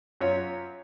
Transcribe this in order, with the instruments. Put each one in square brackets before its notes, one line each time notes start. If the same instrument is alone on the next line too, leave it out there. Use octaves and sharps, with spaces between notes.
[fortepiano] F#2 F4 C#5